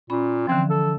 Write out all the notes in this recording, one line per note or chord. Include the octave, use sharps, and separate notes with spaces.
A#2 C#4 B5
D3 E3 F3 C4
A4